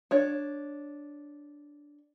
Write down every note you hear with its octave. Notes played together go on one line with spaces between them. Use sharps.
D4 C#5